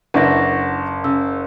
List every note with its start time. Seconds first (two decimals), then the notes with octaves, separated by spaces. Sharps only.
0.14 F#1 D4 E4 B4 F#5 C#6 A#6
1.04 C#3 E6